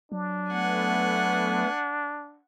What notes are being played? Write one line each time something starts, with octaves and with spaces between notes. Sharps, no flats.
F#3 D4
A3 B3 F#5 G#5